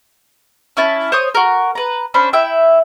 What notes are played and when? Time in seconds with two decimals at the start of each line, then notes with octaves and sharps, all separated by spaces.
0.77 C#4 E4 A5
1.12 C5 C#5 D#6
1.35 F#4 A#4
1.75 B4 A#5
2.14 C#4 D4 C5 B5
2.33 E4 E5 G5